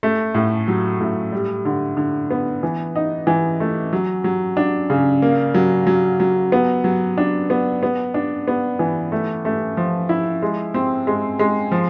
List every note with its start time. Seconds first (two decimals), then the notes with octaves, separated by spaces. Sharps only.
0.03 A3
0.35 A2
0.68 F#3
1.01 A2
1.32 G3
1.65 D3
1.97 D3
2.31 B3
2.63 E3
2.96 D#4
3.27 E3
3.60 A3
3.93 F#3
4.24 F#3
4.57 D4
4.90 C#3
5.22 A#3
5.54 F#3
5.87 F#3
6.20 F#3
6.52 B3
6.84 F#3
7.18 D4
7.50 B3
7.83 B3
8.14 D4
8.48 B3
8.79 E3
9.12 A3
9.45 A3
9.77 F3
10.09 E4
10.42 G#3
10.74 C4
11.07 G#3
11.39 G#3
11.72 F3